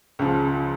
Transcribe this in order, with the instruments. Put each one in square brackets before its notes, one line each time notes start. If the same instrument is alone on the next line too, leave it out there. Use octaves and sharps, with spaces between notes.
[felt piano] C#2 C#3 F3